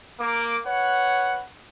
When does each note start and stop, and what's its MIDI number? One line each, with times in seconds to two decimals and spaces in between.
0.19 0.58 58
0.19 0.58 86
0.67 1.43 71
0.67 1.43 73
0.67 1.43 78